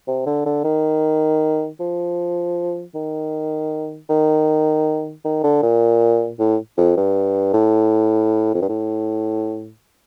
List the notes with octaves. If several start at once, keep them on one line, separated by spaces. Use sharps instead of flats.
C3
D3
D3
D#3
F3
D#3
D#3
D#3
D3
A#2
A2
F2
G2
A2
F2
G2
A2